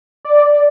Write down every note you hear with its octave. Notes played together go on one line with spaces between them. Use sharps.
D5